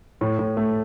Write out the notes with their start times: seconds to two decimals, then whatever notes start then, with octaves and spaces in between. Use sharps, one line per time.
0.21 A2
0.39 A2
0.57 A3